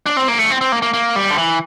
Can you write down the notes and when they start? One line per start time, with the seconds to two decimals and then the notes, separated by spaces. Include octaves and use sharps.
0.06 D4
0.17 C4
0.28 A#3
0.39 A3
0.51 C4
0.61 C4
0.72 A#3
0.82 A#3
0.93 A#3
1.16 G3
1.30 D3
1.38 E3